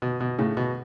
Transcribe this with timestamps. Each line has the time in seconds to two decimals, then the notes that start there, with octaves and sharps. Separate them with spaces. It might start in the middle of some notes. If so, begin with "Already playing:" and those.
0.02 B2
0.21 B2
0.38 A2 C#3
0.57 B2